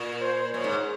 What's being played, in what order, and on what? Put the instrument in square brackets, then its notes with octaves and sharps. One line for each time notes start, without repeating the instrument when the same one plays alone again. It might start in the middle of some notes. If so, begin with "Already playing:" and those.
Already playing: [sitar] A#2
[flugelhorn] C5
[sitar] A#2 [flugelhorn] C#5
[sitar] G#2